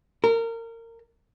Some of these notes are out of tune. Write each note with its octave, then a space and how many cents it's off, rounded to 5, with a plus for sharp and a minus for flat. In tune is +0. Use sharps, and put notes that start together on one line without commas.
A#4 -25